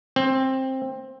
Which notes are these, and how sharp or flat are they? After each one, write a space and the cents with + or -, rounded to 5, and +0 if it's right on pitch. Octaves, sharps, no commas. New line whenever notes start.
C4 +15